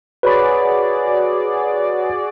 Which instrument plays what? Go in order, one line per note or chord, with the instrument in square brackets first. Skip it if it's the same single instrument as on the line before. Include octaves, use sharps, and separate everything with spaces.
[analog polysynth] F#4 G#4 D5 [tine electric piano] B4 C#5 B5